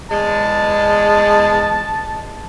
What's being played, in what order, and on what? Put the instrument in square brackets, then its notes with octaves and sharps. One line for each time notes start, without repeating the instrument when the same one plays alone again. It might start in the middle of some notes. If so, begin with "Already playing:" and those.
[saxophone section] E2 G#3 [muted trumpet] A5